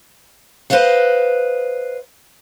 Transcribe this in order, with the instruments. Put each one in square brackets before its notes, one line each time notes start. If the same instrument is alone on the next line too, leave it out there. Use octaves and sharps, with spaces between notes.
[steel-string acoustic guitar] B4 C5 D#5 F5 F#5